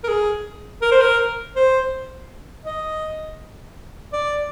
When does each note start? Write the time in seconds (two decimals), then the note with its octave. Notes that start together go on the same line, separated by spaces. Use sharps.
0.04 A#4
0.08 G#4
0.82 A#4
0.91 C5
1.01 A#4
1.56 C5
2.66 D#5
4.13 D5